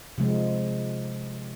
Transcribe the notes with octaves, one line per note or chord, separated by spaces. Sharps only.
C3 F3 G#3